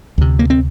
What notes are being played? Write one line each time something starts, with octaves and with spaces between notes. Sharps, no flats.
D2 C3
A#3
C4